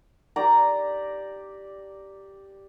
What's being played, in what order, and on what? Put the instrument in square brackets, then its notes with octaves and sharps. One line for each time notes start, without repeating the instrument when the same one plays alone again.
[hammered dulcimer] G4 D5 A#5